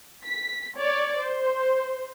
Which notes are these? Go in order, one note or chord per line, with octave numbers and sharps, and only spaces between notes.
B6
C#5 D5
C5